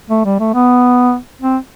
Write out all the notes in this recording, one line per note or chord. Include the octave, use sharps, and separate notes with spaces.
A3
G3
A3
B3
C4